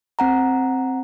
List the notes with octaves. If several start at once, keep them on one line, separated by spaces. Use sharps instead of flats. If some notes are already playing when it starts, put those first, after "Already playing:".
C4 F#5 A#5